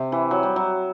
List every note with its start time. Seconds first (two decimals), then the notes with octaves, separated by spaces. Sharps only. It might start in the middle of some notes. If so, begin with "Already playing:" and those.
Already playing: C3
0.12 E3
0.31 F#3
0.43 G3
0.56 F#3